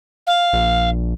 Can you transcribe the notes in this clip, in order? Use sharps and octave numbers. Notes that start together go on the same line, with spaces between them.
F5
A#1